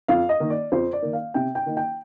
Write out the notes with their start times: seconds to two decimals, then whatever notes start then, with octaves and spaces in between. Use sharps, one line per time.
0.08 F2 F5
0.29 D#5
0.40 D#3 A#3
0.50 D5
0.72 F2 C5
0.93 D5
1.02 D#3 A#3
1.13 F5
1.34 C3 G5
1.55 G5
1.66 D#3 A#3 D#4
1.77 G5